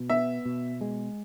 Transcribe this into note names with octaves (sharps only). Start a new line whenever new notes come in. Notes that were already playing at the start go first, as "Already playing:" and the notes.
Already playing: B2
B3 E5
B2
G#3